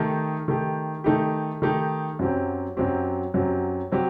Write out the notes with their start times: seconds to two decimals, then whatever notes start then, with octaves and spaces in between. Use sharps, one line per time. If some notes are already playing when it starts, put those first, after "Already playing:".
Already playing: D#3 A3 D#4 G4
0.48 D#3 A3 D#4 G4
1.04 D#3 A3 D#4 G4
1.62 D#3 A3 D#4 G4
2.19 F#2 F#3 C4 G4
2.77 F#2 F#3 C4 G4
3.34 F#2 F#3 C4 G4
3.92 F#3 C4 G4